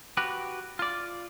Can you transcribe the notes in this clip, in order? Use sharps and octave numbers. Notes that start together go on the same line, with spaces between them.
F#4 G4 B4
F4 D5